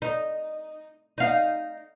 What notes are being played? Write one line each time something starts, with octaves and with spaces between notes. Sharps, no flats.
D#4
D#4 F5